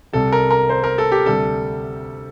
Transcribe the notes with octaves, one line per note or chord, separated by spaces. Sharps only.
C2 C3 G3 A4
A#4
A#4
C5
A#4
A4
G4
D2 C3 G3 A4